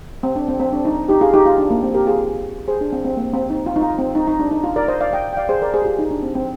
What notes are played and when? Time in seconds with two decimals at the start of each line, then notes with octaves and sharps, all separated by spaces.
0.23 C4
0.36 D4
0.48 C4
0.60 C4
0.73 D4
0.85 D#4
1.08 D#4 G4
1.21 F4 G#4
1.33 D#4 G4
1.46 F4
1.58 D4
1.70 A#3
1.82 C4
1.94 G4 A#4
2.07 F4 G#4
2.68 G#4 C5
2.81 D4
2.92 C4
3.05 C4
3.17 A#3
3.33 C4
3.50 D#4
3.66 F4
3.76 D#4
3.82 F4
3.98 C4
4.15 D#4
4.28 D#4
4.39 D4
4.51 D#4
4.64 F4
4.76 A#4 D5
4.88 C5 D#5
5.00 D5 F5
5.13 D#5 G5
5.33 G5
5.37 D5 F5
5.49 G#4 C5
5.62 A#4 D5
5.74 G#4 C5
5.82 G4
5.86 F4
5.99 D#4
6.11 D4
6.23 C4
6.35 C4